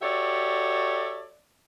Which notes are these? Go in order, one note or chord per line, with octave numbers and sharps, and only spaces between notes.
F#4 G4 A4 C#5 D5 E5